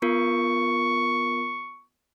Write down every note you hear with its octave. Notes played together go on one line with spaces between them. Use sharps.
B3 F4 A#4 C#6